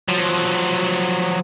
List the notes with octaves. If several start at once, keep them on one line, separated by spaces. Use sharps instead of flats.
F3 F#3